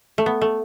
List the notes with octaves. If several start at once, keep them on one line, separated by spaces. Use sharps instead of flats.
A3
B3
A3